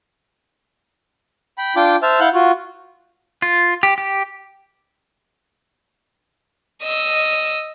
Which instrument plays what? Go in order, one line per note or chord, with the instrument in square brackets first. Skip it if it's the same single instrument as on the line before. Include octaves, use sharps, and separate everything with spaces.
[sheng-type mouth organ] G5 B5
D4 F4 G5 D6
C5 E5 A5 F6
E4 F5 F#5 F#6 G6
F4 F#4
[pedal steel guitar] F4
G4
G4
[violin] D#5 E6